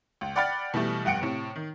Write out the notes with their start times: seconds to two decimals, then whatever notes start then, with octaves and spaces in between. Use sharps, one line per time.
0.21 C#2
0.36 D5 F#5 G5 B5 F6 A6
0.74 B2 E3 G3 A3
1.05 F1 G2 F#5 G5 C#7 D7
1.21 A2 C3
1.56 D#3